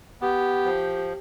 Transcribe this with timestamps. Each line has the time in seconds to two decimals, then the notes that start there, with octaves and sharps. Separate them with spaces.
0.21 B3 G4
0.65 F3